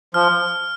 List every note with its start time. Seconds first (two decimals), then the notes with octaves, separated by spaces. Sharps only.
0.14 F3 F6